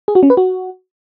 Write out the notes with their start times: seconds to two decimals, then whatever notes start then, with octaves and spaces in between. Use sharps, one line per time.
0.08 G#4
0.15 F#4
0.23 C#4
0.30 B4
0.37 F#4